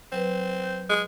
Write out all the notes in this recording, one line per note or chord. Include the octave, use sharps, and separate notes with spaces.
F#3 C4 B4
G6
G#3